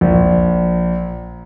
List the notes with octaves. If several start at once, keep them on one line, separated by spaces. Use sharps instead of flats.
A#1